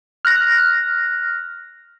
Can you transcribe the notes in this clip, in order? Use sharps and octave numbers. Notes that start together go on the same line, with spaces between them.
F6 F#6 A#6